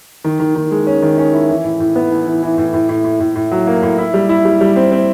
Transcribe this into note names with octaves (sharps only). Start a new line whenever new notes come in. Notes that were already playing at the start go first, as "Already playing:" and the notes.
D#3
D#3
D#3
G#3
C#4
D#3
C#4
E4
E3
A2
A2
B3
E3
E3
E3
A2
A2
A2
A2
A2
A2
F#3
A#3
A2
E4
G3
E4
G3
G3
C4
C4